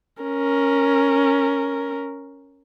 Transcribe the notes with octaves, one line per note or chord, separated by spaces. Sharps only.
C#4 A#4